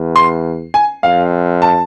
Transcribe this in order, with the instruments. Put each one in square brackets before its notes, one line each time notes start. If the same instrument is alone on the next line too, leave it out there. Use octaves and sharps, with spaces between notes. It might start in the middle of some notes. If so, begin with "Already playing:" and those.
Already playing: [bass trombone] E2
[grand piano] C6
G#5
[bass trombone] F2 [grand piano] F5
[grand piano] A5